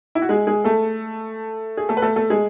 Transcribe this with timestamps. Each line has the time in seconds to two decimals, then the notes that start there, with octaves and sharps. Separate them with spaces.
0.15 E4
0.22 F#4
0.29 G#3 G#4
0.47 G#3 G#4
0.64 A3 A4
1.77 G#4
1.89 A3 A4
1.97 B4
2.02 A3 A4
2.16 A3 A4
2.30 G#3 G#4